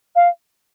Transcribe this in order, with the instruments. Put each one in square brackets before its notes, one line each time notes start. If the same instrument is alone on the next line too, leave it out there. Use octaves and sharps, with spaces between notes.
[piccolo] F5